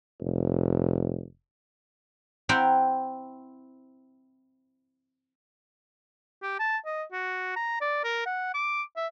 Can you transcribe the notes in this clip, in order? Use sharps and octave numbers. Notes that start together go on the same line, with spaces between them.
F1
C4 E4 F#5 G5 A#5 C6
G4
A5
D#5
F#4
A#5
D5
A#4
F#5
D6
E5